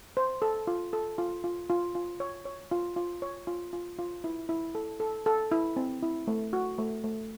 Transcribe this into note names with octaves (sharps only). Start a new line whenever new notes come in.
C5
A4
F4
A4
F4
F4
F4
F4
C#5
C#5
F4
F4
C#5
F4
F4
F4
E4
E4
A4
A4
A4
E4
C4
E4
A3
F#4
A3
A3